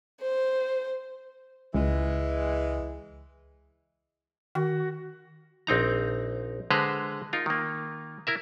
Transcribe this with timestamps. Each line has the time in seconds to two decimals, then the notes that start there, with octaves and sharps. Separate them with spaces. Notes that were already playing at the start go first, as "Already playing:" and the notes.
0.22 C5
1.74 C#2 E3 G#3
4.55 D#3 F#4
5.67 A#1 C4 D#4 A#5
6.71 D3 G#3 B4 C5 A#5
7.33 D#4 F4 A#4
7.46 D#3 A#3
8.27 E4 A#4 E5